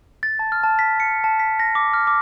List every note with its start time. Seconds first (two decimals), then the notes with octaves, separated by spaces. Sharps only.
0.23 A6
0.39 A5
0.52 F6
0.63 A5
0.79 B6
1.00 C#7
1.24 A5
1.40 B6
1.59 A#6
1.75 D6
1.94 F6
2.07 D6